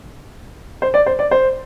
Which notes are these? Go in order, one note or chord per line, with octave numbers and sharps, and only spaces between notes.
C5
D5
C5
D5
C5